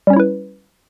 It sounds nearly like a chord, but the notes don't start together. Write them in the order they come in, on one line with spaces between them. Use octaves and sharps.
G3 C#4 C#5 E4 B4